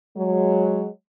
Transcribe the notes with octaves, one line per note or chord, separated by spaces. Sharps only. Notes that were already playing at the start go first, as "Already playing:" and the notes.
F#3 G#3